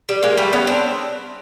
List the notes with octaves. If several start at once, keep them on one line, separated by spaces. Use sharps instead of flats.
G3
G#3 A#3
G3 A3
B3 C#4
C4 D4